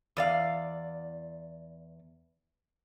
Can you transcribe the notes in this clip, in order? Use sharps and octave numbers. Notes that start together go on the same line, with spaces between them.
E2 D5 F5